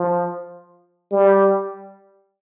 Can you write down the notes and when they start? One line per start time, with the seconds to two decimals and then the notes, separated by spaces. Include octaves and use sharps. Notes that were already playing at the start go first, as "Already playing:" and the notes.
Already playing: F3
1.12 G3